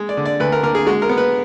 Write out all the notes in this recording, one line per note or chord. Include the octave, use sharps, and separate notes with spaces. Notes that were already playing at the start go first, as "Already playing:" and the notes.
Already playing: G#3
D5
D3
D5
D2 B4
A#4
D3 A#4
G#4
G#3 F#4
A#4
B3
B4